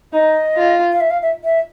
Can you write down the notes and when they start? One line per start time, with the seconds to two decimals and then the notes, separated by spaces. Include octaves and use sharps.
0.13 D#4 D#5
0.57 F4
0.92 F5
1.00 E5
1.10 F5
1.22 E5
1.44 E5